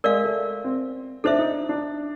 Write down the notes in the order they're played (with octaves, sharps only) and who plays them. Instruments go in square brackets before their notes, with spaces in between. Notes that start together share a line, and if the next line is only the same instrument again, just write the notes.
[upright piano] G#3 [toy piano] A#4 D5 F5
[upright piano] A3
C4
[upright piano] D4 [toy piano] A4 C5 E5
[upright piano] D#4
D4